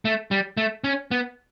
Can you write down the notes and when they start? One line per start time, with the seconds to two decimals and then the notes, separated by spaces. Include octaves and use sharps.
0.05 A3
0.31 G3
0.57 A3
0.84 C#4
1.11 B3